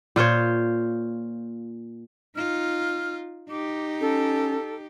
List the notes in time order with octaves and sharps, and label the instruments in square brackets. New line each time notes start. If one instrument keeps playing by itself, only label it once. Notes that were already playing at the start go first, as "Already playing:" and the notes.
[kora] A#2 F4 C5 C#5
[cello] D#4 F4 [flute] F6
[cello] D#4 G4 [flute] D6
[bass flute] C#4 [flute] A4